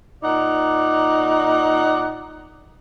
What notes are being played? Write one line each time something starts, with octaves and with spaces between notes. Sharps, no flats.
A#2 D#4 D5 F#5